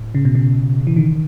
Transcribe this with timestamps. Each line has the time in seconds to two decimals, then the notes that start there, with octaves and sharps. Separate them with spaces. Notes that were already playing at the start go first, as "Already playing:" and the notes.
Already playing: A2
0.15 C#3
0.25 B2
0.35 C#3
0.87 E3
0.96 D#3